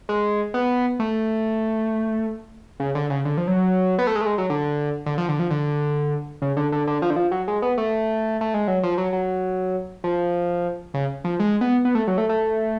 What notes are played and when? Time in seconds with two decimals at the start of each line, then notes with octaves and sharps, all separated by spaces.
0.09 G#3
0.54 B3
0.99 A3
2.80 C#3
2.95 D3
3.10 C#3
3.25 D3
3.37 F3
3.48 F#3
3.99 B3
4.07 A3
4.15 G#3
4.21 A3
4.26 G#3
4.38 F#3
4.50 D3
5.06 D3
5.18 F3
5.29 D3
5.39 F3
5.51 D3
6.42 C#3
6.57 D3
6.72 D3
6.87 D3
7.02 F3
7.10 D3
7.16 F3
7.31 F#3
7.48 G#3
7.62 B3
7.78 A3
8.41 A3
8.54 G#3
8.68 F#3
8.83 F3
8.98 F#3
9.13 F#3
10.04 F3
10.94 C#3
11.24 F3
11.40 G#3
11.61 B3
11.85 B3
11.95 A3
12.07 F#3
12.18 A3
12.29 A3